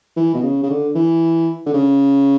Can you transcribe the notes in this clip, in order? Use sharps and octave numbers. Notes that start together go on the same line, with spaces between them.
E3
B2
C#3
C#3
D3
E3
D3
C#3